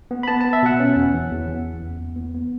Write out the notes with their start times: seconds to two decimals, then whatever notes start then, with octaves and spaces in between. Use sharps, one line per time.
0.11 B3
0.23 B5
0.28 B3 A5
0.41 A5
0.45 B3
0.53 E5
0.63 B2 F#5
0.80 C#4
0.96 E2
1.14 E3
1.31 E2
1.48 E2
1.65 E3
1.82 E2
1.99 E2
2.16 B3
2.34 B3